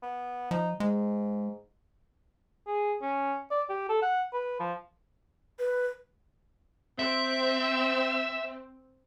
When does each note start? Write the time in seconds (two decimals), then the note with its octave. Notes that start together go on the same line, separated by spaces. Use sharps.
0.03 B3
0.51 F3 D#4
0.80 G#2 G#3
2.67 G#4
3.02 C#4
3.51 D5
3.70 G4
3.89 A4
4.02 F#5
4.33 B4
4.60 F3
5.59 B4
6.99 C4 E5